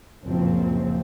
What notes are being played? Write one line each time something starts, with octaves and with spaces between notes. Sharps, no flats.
F#1 C#2 A#2 F3 C4